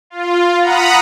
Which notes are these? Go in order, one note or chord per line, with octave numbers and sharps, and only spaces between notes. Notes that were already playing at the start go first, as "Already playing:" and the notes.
F4
F#5 A#5 B5 D#6